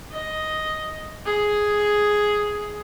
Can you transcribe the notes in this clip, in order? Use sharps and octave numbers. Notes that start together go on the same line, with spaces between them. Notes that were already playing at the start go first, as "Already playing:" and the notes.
D#5
G#4